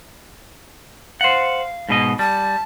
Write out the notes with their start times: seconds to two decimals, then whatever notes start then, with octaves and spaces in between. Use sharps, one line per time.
1.21 C5 F5 F#5
1.89 G#2 B2 D#5
2.19 G3 A5